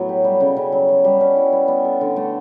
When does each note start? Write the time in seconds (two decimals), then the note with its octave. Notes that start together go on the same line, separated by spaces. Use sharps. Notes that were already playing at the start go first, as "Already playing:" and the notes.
Already playing: A2 F#3 B3
0.09 G4
0.24 G3
0.40 C#3
0.56 C#3
0.72 F#3
0.88 B3
1.04 G3
1.21 C#4
1.36 E4
1.53 B3
1.68 B3
1.85 A4
2.01 D3
2.16 A3